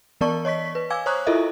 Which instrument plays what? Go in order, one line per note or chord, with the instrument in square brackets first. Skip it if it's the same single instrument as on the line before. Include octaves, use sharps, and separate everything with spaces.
[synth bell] E3 B3 A#4 D5 A5 C#6
C#5 D#5 C#6 B6
B4
F5 G#5 D6 E6 G#6
C5 C#5 A#5 C#6 D#6 F#6
E4 F4 A4 A#4 D#5 E5